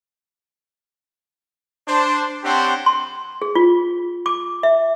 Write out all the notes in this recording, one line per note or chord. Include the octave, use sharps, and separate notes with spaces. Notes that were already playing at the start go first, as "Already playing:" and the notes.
D4 C5
C4 D4 G4 C5 C#5 F#5
C6
G#4
F4
D6
E5